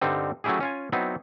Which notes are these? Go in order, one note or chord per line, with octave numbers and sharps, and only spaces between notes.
G2 D3 G3 C4 D#4
F#3 A3 C#4 E4 G4 G#4
C#4 F4 G#5
F#3 B3 C4 D#4 E4